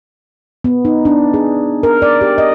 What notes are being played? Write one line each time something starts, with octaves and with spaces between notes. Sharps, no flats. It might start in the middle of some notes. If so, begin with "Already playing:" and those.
B3
D#4
D4
G#4
A#4
D5
G4
D#5